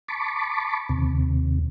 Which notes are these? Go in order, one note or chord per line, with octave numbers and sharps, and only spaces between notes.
A5 B5 C#6 D6
D#2 C3